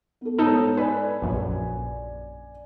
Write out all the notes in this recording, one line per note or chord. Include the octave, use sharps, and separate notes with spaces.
B3 A4
G#2 B3 D#4 A4 C#5
B4 D5 G#5
A#1 F#2